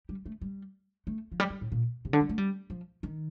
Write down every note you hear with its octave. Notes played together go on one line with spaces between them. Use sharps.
G3
A3
G3
A3
F3
G3
G3
A2
A#2
C3
D3
G3
A3
G3
F3
D#3